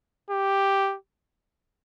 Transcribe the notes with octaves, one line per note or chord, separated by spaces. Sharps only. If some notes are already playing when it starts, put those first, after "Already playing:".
G4